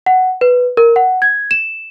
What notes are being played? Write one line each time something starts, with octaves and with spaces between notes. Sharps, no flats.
F#5
B4
A#4
F#5
G#6
E7